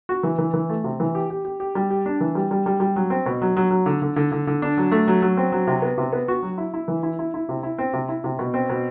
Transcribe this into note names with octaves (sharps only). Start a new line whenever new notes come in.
F#4
E3
E3
E3
A3
C3
E3
G4
G4
G4
G4
G3
G4
D4
E3
G3
G3
G3
G3
F#3
C4
B2
F#3
F#3
F#3
D3
D3
D3
D3
D3
D4
F#3
A3
F#3
F#3
C4
F#3
C3
B3
C3
B3
F#4
F#3
E4
E4
E3
E4
E4
E4
C3
E4
C4
C3
E4
C3
B2
C4
B2